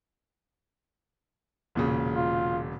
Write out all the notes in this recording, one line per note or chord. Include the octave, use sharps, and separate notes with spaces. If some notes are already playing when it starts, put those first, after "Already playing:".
E1 A#2 C#3
F4